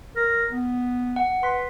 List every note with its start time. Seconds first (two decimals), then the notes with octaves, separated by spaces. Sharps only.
0.16 A#4
0.51 B3
1.16 F#5
1.43 B4 C6